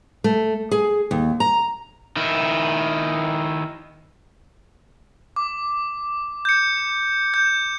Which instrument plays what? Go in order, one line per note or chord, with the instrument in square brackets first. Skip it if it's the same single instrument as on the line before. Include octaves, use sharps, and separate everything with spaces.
[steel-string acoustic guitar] A3
G#4
D#2
A#5
[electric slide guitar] D#3 E4
[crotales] D6
G6 C#7
G6